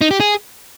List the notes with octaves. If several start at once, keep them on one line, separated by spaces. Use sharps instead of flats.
D#4
G4
G#4